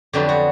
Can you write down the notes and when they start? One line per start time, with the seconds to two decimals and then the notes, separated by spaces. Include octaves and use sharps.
0.13 F2 D3 F#3 B3 G4
0.29 F#4